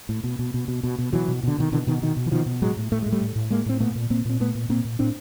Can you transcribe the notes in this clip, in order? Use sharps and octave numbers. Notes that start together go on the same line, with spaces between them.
A2
B2
B2
B2
B2
B2
B2
B2 E3 F#3
B2
B2 D3
B2 D#3
B2 D3 E3
B2 D#3
B2 D#3
B2
E3
B2 D#3 F3
B2
A2 F#3 G#3
A2
A2 A3
A2 G#3
G3 A3
A2
A2
A2 G#3 A#3
A2 C4
A#2 A3 B3
A#2
A#2 A#3 C4
A#2 C4
A#2 A3 B3
A#2
A#2 A#3 C4
A#2
A2 C4 D4